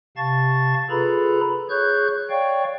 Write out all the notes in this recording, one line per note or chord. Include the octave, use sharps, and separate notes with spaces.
C3 F5 A5 C#6 A6
F4 G#4 A4 B4 A#5 B5
G#4 C#5 C#6 F#6 G6
C#5 D5 F5 G5 C#6